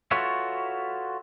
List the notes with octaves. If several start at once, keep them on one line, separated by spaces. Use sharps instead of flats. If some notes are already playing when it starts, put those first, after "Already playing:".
F4 F#4 A4 B4 C#5 E5